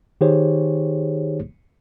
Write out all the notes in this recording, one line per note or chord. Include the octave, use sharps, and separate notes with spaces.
D#3 D#4 G4 G#4 C5 C#5